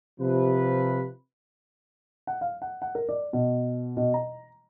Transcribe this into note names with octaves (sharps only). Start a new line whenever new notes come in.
C3 F3 B4
F#5
F5
F#5
F#5
A#4
D5
B2
B2
A#5